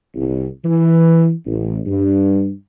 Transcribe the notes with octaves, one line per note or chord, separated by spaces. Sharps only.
C2
E3
A1
G2